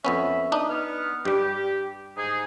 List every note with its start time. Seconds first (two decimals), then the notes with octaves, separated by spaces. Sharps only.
0.05 F2 B3 C#4 E5 B5
0.52 D4 D#4 D#6
0.69 B3 F6
1.25 G2 G3 G4
2.17 G#2 D#4 G#4